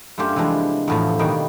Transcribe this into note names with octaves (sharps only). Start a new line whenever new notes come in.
F#2 A3 D4 F4 G4
C3 E3 F3 G3 G#3 D4
E2 A2 F3
B2 D#3 G3 A#3